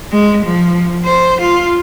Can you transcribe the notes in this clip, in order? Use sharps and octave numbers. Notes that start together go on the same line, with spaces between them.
G#3
F3
C5
F4